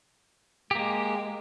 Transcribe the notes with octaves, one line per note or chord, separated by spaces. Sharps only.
G#3 A#3 G4